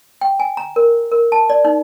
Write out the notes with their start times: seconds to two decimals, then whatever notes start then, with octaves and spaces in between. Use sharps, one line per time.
0.21 G5
0.40 G#5
0.57 A#5
0.76 A#4
1.11 A#4
1.32 A5
1.50 D5
1.65 D#4